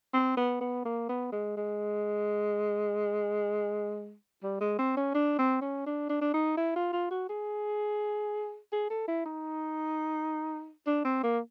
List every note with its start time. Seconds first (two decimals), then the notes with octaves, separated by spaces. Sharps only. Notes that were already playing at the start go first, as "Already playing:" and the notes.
0.13 C4
0.37 B3
0.61 B3
0.85 A#3
1.09 B3
1.32 G#3
1.57 G#3
4.43 G3
4.61 G#3
4.79 C4
4.97 C#4
5.15 D4
5.38 C4
5.61 C#4
5.86 D4
6.09 D4
6.21 D4
6.34 D#4
6.57 E4
6.76 F4
6.93 F4
7.11 F#4
7.29 G#4
8.72 G#4
8.90 A4
9.08 E4
9.25 D#4
10.86 D4
11.05 C4
11.23 A#3